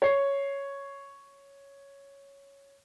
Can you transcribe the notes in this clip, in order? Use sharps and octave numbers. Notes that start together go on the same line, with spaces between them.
C#5 C7